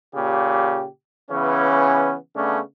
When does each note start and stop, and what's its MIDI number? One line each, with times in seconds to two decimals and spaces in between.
0.15 0.85 46
0.15 0.85 49
0.15 0.85 67
1.30 2.16 49
1.30 2.16 52
1.30 2.16 59
1.30 2.16 61
2.35 2.60 49
2.35 2.60 57
2.35 2.60 59
2.35 2.60 61
2.35 2.60 62